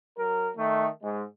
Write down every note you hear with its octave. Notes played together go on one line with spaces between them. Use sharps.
F#3 A#4
D#3 A3
G#2 G#3